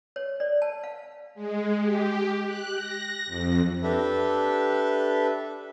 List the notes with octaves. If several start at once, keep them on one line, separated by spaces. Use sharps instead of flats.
C#5
D5
A5
F5
G#3
G4
F#6
A#6
F2
D4 G4 A4 B4 E5